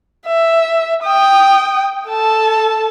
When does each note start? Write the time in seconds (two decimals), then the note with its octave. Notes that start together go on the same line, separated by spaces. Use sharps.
0.27 E5
1.03 G5 D#6
2.09 A4 A5